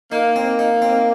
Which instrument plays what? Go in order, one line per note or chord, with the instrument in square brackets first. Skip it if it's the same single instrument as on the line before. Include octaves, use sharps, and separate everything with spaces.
[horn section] A#3 [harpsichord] D#4
[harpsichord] C4
D#4
C4